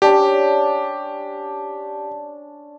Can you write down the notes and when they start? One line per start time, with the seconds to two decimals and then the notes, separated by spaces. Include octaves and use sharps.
0.02 C#4 D4 G4